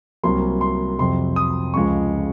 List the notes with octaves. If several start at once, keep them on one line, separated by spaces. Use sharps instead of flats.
C2 C3 F#3 A#3 C6
C6
F2 C3 F#3 C6
D#6
C#2 C#3 F3 G#3 C#6